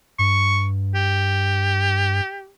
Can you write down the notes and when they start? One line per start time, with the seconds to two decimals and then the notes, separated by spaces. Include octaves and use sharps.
0.19 G2 C#6
0.95 G4